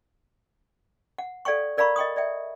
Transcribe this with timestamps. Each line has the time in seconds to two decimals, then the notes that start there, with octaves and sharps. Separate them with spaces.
1.18 F#5
1.45 A4 D5 F5 G5 C#6
1.77 A#4 D5 F5 A#5 B5 C#6
1.96 D#5 G5 C#6 D#6
2.16 D5 E5 G5